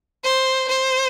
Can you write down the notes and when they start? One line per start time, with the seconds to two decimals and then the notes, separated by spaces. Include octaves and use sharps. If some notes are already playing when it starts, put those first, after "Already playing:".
0.24 C5
0.69 C5